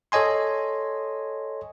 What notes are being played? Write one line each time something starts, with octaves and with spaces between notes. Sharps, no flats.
A4 C#5 D#5 G#5 C6